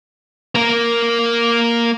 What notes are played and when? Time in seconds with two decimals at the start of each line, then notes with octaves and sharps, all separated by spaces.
0.55 A#3 A#4